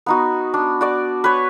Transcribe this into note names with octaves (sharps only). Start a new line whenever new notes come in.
B3 D#4 F#4
D4
F#4 D5 D6
B4 C#5